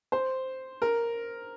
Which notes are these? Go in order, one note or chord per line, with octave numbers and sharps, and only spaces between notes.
C5
A#4